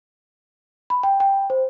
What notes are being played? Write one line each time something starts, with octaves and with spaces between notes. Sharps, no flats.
B5
G5
G5
C5